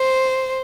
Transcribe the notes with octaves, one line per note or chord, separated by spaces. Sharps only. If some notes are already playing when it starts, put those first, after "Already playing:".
Already playing: C5